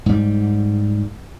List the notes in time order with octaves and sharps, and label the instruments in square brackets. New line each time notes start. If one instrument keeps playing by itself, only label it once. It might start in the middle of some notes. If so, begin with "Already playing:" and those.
[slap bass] G#2 G3